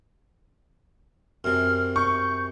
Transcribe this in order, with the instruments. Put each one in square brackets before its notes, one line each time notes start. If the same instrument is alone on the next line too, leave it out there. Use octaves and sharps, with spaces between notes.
[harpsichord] F#2 C3 [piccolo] F6
[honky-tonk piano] C#6 [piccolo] G6